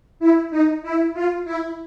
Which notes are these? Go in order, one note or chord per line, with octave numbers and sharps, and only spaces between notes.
E4
D#4
E4
F4
E4